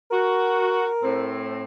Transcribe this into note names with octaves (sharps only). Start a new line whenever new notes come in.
F#4 A#4
A2 C4